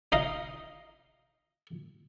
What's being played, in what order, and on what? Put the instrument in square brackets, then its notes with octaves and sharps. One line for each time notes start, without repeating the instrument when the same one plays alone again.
[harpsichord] D#4 D#5 F5